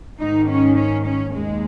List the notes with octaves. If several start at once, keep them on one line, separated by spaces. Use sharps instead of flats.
G#2 D#3 D#4
C#4
C#4
C#4
D#2 G#3